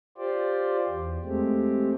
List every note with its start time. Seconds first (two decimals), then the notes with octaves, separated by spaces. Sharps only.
0.18 F4 G4 C5 D5
0.89 E2
1.24 G#3 A3 C4 G4